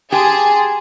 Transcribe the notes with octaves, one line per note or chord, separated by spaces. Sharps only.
G4 G#4 A5 C6